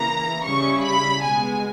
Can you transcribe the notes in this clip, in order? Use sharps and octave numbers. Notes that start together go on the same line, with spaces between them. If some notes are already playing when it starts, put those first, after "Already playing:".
Already playing: C#3 E3 A#3 A#5
C#3 G3 C#4 E4 C#6
B5
B2 G#3 B3 G#5